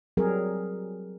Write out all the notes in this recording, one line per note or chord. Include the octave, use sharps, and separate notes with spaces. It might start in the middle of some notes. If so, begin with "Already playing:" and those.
F#3 G3 C4 G#4 A#4